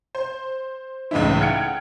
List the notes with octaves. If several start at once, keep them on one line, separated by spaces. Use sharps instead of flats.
C5
C#2 A2 C#3 E3 D#4 E4
F#5 G5 F6 G#6 C#7 D7